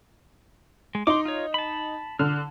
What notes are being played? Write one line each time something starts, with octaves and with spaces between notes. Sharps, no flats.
G#3
D#4 C6 D6
F4 C#5
A5 B5
D3 F6